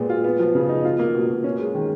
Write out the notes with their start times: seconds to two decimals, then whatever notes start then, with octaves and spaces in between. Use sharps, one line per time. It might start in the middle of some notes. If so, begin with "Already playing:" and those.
Already playing: A#2 G#3 B3
0.09 F4
0.24 B3
0.39 F3
0.55 C#3
0.69 D#4
0.85 F4
0.99 A#3
1.14 B2
1.30 B2
1.44 C#4
1.60 G#3
1.75 D#3